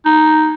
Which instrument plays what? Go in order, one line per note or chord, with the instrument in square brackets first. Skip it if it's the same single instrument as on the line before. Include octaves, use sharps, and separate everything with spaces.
[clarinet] D#4